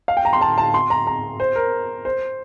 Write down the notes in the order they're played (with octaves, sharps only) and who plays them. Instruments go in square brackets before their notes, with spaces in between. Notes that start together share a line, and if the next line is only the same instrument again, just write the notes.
[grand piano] F5
G5
A#5
C6
A5
A5
C6
A#5
A#5
C5
A#4
C5